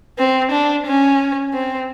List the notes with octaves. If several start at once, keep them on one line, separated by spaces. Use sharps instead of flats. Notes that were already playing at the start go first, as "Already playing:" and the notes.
C4
D4
C#4
C4